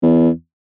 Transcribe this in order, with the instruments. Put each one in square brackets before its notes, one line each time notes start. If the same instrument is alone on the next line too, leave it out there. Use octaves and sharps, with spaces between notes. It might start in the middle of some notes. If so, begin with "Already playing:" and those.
[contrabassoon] E2